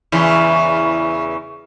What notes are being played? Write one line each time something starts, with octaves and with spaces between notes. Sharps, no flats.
E2 C#3 E3